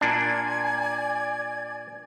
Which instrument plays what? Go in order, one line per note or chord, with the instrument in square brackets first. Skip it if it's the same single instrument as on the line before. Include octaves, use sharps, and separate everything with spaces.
[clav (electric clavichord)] A#2 D4 [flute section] D5 G#5 G#6